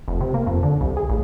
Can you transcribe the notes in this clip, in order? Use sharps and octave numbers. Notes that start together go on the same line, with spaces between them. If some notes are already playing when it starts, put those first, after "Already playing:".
F1
C3
A#3
F2
D3
C2
G#4
A1